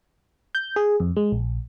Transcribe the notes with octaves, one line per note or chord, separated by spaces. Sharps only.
G6
G#4
F2
G#3
A#1